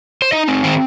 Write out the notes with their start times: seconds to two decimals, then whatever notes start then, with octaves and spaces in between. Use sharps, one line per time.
0.22 C5
0.32 D#4 D#5
0.48 C4
0.64 D#3 C5